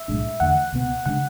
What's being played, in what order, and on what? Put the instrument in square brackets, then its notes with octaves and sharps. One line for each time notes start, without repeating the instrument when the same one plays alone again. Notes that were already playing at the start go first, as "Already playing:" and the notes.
Already playing: [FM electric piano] E5
[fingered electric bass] B1 A2 G#3 D4
[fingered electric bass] E2 D3 A3 [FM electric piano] F#5
[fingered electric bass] C#2 B2 F#3 B3
[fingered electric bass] C#3 G#3 D4 [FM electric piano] F#5